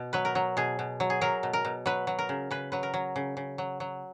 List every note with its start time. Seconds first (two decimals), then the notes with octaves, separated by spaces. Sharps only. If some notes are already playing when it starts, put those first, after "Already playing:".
Already playing: B2
0.13 F#3 B4
0.25 A#4
0.35 F#3
0.57 B2 G#4
0.79 B2
1.00 F#3
1.10 G#4
1.21 F#3 A#4
1.43 B2
1.53 A#4
1.65 B2
1.86 F#3 B4
2.07 F#3
2.19 A#4
2.29 C#3
2.51 C#3 B4
2.72 F#3 B4
2.83 A#4
2.94 F#3
3.16 C#3
3.37 C#3
3.58 F#3
3.80 F#3